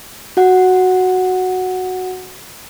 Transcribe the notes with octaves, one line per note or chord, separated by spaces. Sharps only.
F#4 F#5